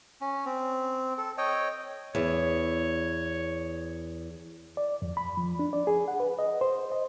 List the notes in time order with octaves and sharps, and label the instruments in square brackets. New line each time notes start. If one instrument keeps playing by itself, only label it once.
[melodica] C#4
C4
A4
C#5 D#5 G5
[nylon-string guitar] E2 [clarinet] C#5
[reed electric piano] D5
F2
B5
F3
D4
D5
G#4
F#5
B4
D#5
C5
D#5